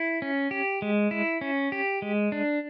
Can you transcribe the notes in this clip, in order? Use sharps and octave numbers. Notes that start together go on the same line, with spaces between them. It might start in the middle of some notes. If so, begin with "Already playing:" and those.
Already playing: E4
C#4
G4
G#3
E4
C#4
G4
G#3
D4